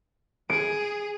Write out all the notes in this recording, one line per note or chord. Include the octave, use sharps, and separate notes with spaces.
G#4 D7